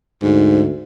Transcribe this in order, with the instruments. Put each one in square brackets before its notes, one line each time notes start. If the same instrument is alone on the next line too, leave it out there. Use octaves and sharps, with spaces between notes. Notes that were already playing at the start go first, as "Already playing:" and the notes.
[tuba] D2 [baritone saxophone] G#2